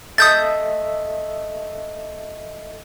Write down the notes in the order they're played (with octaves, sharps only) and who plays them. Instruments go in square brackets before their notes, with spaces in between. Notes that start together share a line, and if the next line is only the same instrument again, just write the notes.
[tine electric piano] A4 D#5 E5 [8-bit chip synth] D#6 G6 A6